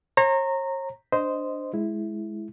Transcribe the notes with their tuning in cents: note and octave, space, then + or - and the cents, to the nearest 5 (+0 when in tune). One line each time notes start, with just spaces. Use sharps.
C#5 -45 A#5 -15
D4 +0 C5 -10 D#5 +0
G#3 +15 E4 +0